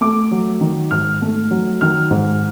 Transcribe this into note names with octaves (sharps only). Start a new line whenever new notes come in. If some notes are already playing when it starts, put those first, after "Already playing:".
A3 D6
F#3
D#3
G#2 F6
A3
F#3
D#3 F6
G#2